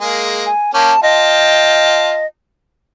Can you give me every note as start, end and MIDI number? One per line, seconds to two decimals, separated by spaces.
0.01 0.48 56
0.01 0.48 58
0.01 0.48 68
0.46 0.72 80
0.74 0.93 58
0.74 0.93 61
0.74 0.93 67
0.74 1.01 81
1.03 2.22 65
1.03 2.26 75
1.03 2.22 79
1.03 2.22 81